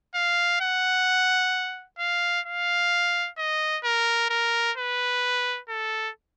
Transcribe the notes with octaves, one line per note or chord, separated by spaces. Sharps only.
F5
F#5
F5
F5
D#5
A#4
A#4
B4
A4